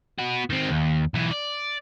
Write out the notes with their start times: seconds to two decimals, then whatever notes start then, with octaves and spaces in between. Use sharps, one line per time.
0.18 B3 F#4
0.50 D#3 C4
0.71 D#2
1.14 B1 E3
1.31 D5